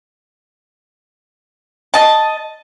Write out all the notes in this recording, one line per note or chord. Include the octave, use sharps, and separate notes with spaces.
D#5 A5